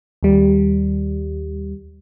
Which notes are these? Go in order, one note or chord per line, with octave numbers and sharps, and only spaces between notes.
D#2 G3